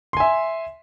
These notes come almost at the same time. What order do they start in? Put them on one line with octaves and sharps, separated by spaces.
C6 G#5 E5